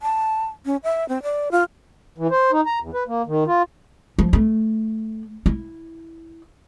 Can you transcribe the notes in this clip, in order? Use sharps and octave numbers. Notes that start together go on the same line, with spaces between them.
A5
C#4
E5
C4
D5
F4
E3
C5
D#4
A#5
E2
B4
A#3
D#3
F4
F3
A3
E4